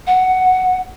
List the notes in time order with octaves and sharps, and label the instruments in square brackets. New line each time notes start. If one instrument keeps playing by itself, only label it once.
[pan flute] F#5